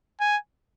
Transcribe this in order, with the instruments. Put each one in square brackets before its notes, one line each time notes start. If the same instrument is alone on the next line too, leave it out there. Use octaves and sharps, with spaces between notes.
[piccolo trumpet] G#5